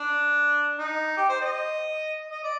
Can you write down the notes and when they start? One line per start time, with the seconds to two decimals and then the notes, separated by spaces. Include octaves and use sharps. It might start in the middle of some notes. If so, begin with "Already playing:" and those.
Already playing: D4
0.79 D#4
1.17 G4
1.29 C5
1.41 D#5
2.31 D#5
2.43 D5